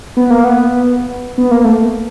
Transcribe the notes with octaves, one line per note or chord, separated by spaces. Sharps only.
B3
A#3
B3
B3
A#3
A3